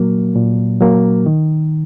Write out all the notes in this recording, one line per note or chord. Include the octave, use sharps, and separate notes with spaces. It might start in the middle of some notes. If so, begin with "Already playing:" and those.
Already playing: A#2 F#3 A#3
A#2
F#3 A#3
D#3